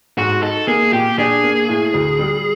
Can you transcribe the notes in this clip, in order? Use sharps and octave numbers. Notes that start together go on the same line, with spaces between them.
G#2 F#4
D#4 A4
A#3 G#4
A#2 G4
D4 G#4
A#3
A2
D2
G3